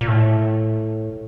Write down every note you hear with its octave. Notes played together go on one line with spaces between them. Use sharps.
A#2
A2